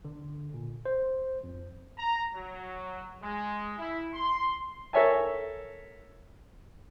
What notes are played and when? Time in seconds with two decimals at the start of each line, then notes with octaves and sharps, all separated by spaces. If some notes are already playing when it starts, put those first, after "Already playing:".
0.05 D3
0.54 A#2
0.85 C5
1.44 F2
1.97 A#5
2.34 F#3
3.21 G#3
3.78 E4
4.13 C6
4.93 A4 A#4 C#5 E5 G#5 A5